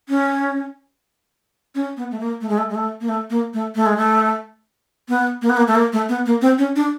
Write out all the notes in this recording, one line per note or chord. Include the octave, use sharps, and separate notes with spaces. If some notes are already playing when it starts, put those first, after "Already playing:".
C#4
C#4
B3
A3
A#3
A3
G#3
A3
G#3
A3
A#3
A3
A#3
A3
A3
G#3
A3
B3
A#3
B3
A#3
A3
A#3
A3
B3
A#3
C4
C#4
D4